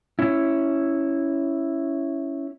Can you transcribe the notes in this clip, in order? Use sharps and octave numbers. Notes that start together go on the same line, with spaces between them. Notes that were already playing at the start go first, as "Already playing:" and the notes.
C#4 E4